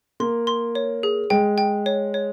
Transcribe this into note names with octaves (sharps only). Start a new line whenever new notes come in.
A#3 C6
C6
C#5
G#4
G#3 G5
G5
C#5
C#5